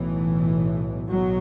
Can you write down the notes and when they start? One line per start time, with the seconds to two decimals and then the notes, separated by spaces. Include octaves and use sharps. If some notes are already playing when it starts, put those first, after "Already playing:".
Already playing: B1 A2 E3
1.10 B1 F#3